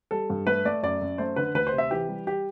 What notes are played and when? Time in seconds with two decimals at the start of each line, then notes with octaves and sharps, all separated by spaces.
0.11 G3 A4
0.30 G2
0.47 A3 B4
0.65 A3 D5
0.83 F#2 D5
1.01 F#2
1.18 A3 C5
1.36 D3 B4
1.54 D2 B4
1.67 C5
1.72 C3
1.78 E5
1.91 E3 G4
2.09 G3
2.27 G4